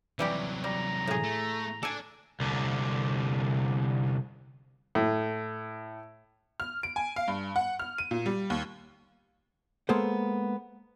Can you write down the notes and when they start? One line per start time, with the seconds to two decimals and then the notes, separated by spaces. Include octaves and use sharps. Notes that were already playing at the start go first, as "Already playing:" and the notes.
0.19 C3 E3 F#3 G3 G4
0.64 G3 A#5
1.07 A2 G#4
1.23 A3
1.83 D4 A4 D5 G#5
2.40 C2 D3
4.95 A2
6.60 F6
6.83 D7
6.96 G#5
7.16 F5
7.28 G2
7.56 F#5
7.79 F6
7.98 D#7
8.11 A#2
8.26 G3
8.50 D#2
9.89 G#3 A#3 B3 A4 C5